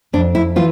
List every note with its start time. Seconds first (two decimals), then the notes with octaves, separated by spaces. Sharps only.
0.13 F2 D4
0.35 E4
0.56 E3 F4